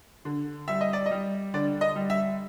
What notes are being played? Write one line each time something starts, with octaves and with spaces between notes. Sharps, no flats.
D3
G3 E5
D#5
D5
D#5
G3
D3 D5
D#5
G3
E5